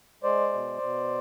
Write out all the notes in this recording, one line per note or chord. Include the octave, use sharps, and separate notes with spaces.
G#3 C5 D5
B2
B2